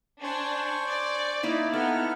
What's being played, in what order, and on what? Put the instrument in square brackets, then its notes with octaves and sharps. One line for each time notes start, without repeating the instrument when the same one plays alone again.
[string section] D4 [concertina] C5 G#5 C#6
[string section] D5
[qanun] A#3 D#4 E4
[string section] B3 [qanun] A4 [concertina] A#5 F6